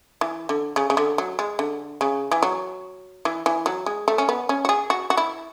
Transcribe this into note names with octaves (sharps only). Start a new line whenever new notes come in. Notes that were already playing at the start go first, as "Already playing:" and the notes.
E3
D3
C#3
C#3
D3
F#3
G#3
D3
C#3
E3
F#3
E3
E3
F#3
G#3
A3
C#4
B3
C#4
F#4
G#4
F#4
F#4
E4